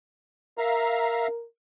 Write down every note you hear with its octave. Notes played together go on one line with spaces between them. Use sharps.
A#4 E5 F5 A#5